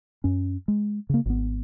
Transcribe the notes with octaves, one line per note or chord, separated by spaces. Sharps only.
F#2 C#4
G#3
C#3 A#3
G#1 B3